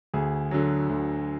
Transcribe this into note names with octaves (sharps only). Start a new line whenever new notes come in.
D2 G#4
D3 F#3
D2